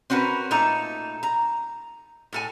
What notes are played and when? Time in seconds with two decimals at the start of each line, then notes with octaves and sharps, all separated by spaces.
0.10 C4 C#4 F#4 A#4 B4
0.51 A#2 A3 D#4 A4 A#5
1.23 A#5
2.33 A2 A4 G#5